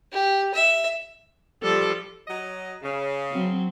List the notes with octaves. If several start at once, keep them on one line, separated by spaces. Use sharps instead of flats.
G4
E5
F3 G3 A4
F#3 D#5
C#3
F#3 C4